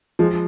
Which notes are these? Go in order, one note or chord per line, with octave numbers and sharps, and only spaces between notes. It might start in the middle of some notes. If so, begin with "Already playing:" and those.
F3 G#3